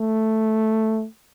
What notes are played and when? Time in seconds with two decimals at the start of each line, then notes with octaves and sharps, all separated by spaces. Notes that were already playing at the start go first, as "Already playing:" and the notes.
Already playing: A3